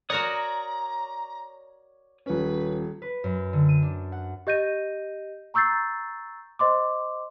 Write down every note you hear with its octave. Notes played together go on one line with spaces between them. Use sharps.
F#4 A#4 C#5 D5 F#5 A#5 D#6
D#1 C#4 B4
B4
F#2
D3
D#7
D4
F#5
G4 D#5 G6 A#6 D#7
A#5 C#6 E6 G6 A6 C7
C5 D#5 C6 D6